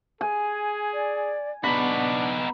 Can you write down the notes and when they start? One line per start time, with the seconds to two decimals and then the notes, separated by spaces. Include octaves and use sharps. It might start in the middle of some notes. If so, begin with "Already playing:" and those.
0.21 G#4 G#5
0.93 D5
1.64 B3 D4 D#4 F#4 B5